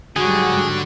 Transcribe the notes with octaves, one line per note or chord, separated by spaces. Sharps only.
G#2 D3 F#3 G3 F#4 G#4